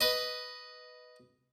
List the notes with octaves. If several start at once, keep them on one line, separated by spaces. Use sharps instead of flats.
B4 D#5